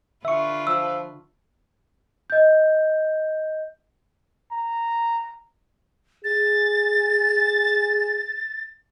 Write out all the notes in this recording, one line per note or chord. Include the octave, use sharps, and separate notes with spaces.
D3 F4 B4 E5 C#6
F3 E6
D#5 G6
A#5
G#4 A6